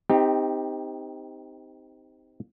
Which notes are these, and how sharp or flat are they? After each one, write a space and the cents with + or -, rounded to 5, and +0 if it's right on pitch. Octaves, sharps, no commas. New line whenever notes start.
C4 -15 D#4 +15 G4 +20